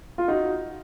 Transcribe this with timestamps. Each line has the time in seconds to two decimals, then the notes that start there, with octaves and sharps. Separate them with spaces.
0.18 F4
0.28 D#4 F#4